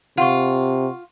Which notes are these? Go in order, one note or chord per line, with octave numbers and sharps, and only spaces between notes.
C3 F4 F#5 C6 C#6